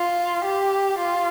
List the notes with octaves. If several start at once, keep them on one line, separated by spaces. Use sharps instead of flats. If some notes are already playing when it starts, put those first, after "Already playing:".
Already playing: F4
G4
F4